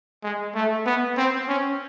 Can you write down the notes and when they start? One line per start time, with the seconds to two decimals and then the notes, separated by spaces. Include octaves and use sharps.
0.23 G#3
0.55 A3
0.86 B3
1.17 C4
1.48 C#4